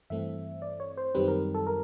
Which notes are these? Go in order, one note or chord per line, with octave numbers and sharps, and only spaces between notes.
G2 E3 A3 C4 E5
D5
C#5
C5
F#2 D#3 G3 C4 B4
A#4
A4
A#4